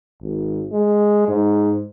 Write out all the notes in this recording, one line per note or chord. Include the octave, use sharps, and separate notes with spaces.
G#1
G#3
G#2